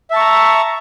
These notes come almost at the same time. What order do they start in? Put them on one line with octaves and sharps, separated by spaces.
E5 A5 C#6 A#5